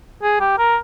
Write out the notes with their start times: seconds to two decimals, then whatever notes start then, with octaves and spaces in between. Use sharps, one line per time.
0.23 G#4
0.41 G4
0.58 A#4